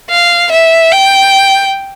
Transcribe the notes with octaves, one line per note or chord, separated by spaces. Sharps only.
F5
E5
G5